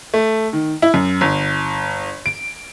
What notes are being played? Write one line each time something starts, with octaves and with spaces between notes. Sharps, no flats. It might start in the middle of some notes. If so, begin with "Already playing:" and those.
A3
D#3
E4
F#2
G1
D7